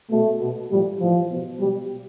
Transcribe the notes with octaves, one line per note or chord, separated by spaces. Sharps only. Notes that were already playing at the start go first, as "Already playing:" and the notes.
B2 A3
B2
A2 F3 G3
A2 E3 F3
B2
B2 G3